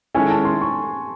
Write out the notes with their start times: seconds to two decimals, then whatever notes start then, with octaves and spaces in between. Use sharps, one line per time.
0.14 D#3 G#3 C#4 E4 A4 G#5
0.30 A5
0.45 C6
0.61 C#6